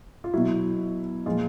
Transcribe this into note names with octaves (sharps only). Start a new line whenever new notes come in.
F4
B2 F#3 E4
A#2 F3 G#3 F4